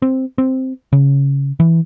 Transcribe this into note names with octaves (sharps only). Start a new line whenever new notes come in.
C4
C4
C#3
E3